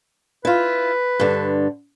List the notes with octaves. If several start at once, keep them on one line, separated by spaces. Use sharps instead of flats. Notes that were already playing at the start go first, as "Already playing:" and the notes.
E4 F4 B4
G2 D3